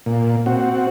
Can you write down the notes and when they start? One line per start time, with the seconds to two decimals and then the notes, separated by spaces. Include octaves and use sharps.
0.06 A#2
0.46 C4 F#4